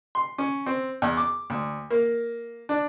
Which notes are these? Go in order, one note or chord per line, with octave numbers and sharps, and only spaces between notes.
C6
C#4
C4
E2
D6
D2
A#3
D4